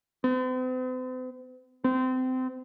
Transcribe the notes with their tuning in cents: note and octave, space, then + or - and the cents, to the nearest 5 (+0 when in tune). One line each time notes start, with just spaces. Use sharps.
C4 -45
C4 -25